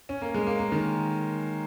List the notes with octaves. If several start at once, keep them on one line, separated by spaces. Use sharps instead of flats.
C#4
A#3
G#3
A#3
A#3
D#3